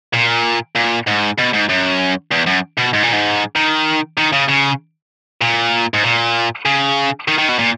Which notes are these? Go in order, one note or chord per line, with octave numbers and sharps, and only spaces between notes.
A#2
A#2
G#2
B2
G#2
F#2
E2
F#2
B2
G#2
A#2
G#2
D#3
D#3
C#3
C#3
A#2
G#2
A#2
C#3
D#3
D#3
B2
A#2